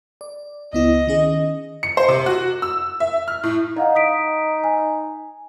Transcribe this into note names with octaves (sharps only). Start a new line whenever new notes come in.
D5
C#2 B3 E4 D#5
D#3 C#4 G#4
C#7
C5
C3
F#4
E6
E5
F6
A2
D#4 D#5 F5 F#5
D#6 B6 D7
G#5